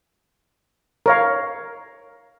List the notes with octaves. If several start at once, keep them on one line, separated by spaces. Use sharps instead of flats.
A#4 C#5 F5